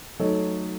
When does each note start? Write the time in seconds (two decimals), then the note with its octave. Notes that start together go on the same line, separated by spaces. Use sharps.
0.19 F#3 A3 D#4 A4 C#5